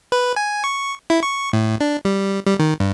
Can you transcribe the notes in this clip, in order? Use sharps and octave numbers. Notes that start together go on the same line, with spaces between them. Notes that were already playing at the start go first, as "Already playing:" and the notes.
B4
G#5
C#6
E4
C#6
A2
D4
G3
G3
D#3
G2